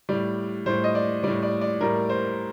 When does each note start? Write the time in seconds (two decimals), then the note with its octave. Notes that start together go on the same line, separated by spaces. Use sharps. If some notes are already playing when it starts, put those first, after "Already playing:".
0.09 A2 G3 D5
0.66 A2 G3 C5
0.84 D#5
0.95 D5
1.23 G3 D5
1.27 A2
1.43 D5
1.61 D5
1.81 A2 G3 A#4
2.09 C5